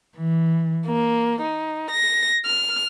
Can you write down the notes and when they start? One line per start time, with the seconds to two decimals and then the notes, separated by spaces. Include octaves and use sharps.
0.16 E3
0.89 A#3
1.43 D#4
1.92 A#6
2.46 F6